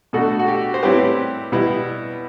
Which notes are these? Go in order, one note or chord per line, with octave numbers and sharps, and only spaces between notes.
B2 A3 D4 F#4 A4
F#4
G4
C5
A2 G3 C4 E4 G4 B4
B2 G3 B3 E4